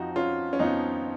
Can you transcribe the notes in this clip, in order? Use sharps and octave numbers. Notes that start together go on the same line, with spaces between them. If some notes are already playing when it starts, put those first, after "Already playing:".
Already playing: F2 F3 D#4 F#4
C#4 F4
C#4
F2 F3 B3 D#4